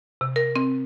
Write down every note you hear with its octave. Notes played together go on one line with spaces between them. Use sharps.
C3
A#4
C4